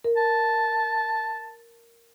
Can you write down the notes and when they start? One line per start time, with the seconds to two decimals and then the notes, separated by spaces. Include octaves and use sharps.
0.04 A#4
0.17 A5